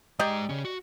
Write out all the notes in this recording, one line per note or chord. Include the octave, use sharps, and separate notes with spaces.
G#3 G4 D5 D#5 A#5
C#3 C#4
F#4